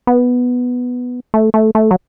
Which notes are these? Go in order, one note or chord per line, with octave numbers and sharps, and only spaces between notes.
B3
A3
A3
A3
F#3